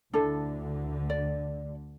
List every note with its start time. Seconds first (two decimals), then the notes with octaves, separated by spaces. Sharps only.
0.13 D2 D3 D4 E4 A4
1.10 D5